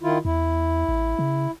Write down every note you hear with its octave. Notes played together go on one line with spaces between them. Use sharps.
D#3 E4 F4
E2 E4
A1
C#3